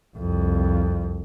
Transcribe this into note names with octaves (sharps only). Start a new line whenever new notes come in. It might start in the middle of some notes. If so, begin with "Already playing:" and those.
C2 F2